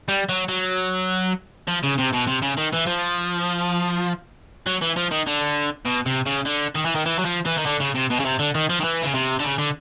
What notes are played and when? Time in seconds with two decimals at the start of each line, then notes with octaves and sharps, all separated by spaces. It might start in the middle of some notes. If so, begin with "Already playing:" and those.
0.08 G3
0.29 F#3
0.49 F#3
1.68 F3
1.83 C#3
1.98 C3
2.13 B2
2.27 C3
2.42 C#3
2.57 D#3
2.73 E3
2.87 F3
4.66 F#3
4.81 E3
4.96 F3
5.11 D#3
5.27 D3
5.86 B2
6.06 C3
6.26 C#3
6.45 D3
6.75 D#3
6.85 E3
6.95 D#3
7.06 E3
7.18 F#3
7.25 F3
7.45 E3
7.57 D#3
7.66 D3
7.80 C#3
7.95 C3
8.10 B2
8.19 C#3
8.25 C3
8.39 D3
8.55 D#3
8.70 F3
8.80 D#3
8.84 E3
9.03 C#3
9.14 C3
9.40 D3
9.44 C#3
9.58 D3